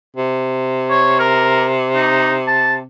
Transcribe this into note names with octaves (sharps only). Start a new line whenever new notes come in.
C3
C#5
A#4
D#4
A5